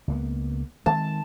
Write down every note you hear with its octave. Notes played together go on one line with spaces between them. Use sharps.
C#2 A#3 B3
D#3 G#3 C4 A5